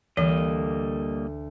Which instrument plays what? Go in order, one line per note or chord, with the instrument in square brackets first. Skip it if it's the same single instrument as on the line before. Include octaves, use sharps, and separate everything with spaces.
[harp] D2 [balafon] E3 [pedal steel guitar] G3 A#3 D#5